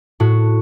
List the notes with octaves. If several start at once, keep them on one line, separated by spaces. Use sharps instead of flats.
A2 F#4